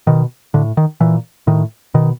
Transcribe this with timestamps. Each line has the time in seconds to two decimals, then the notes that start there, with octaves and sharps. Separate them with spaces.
0.07 B2 D#3
0.54 A2 D3
0.77 D#3
1.01 A#2 E3
1.47 A2 D#3
1.94 B2 D#3